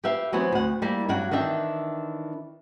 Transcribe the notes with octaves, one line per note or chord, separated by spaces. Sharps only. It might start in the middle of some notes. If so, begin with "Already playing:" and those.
G4 B4 E5 F5 G5
E3 F#3 B3 C4
D2 F#5
G3 A#3 E4
G2 F#3 D4 F#4 F#5 G5
D#3 E3 D4 E5 G5